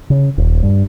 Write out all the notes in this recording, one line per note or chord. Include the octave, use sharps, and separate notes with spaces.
C#3
D#1
G2